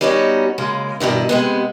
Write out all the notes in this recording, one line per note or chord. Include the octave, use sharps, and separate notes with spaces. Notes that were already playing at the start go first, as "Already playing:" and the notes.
G3 B3 C#4 D#4 F4 F#4
F#2 C#3 G#3 A#3
G2 B2 D#3 E4
C3 G#3 B3